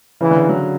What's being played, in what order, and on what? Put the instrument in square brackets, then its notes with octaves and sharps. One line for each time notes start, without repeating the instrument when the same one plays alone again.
[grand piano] C#3 [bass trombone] E3
[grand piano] D3
C#3
F#3